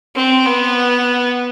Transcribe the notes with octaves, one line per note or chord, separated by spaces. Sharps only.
C4
B3